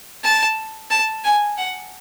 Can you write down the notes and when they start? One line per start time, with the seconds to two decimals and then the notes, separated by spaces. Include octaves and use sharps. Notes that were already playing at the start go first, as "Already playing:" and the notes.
0.24 A5
0.91 A5
1.24 G#5
1.58 F#5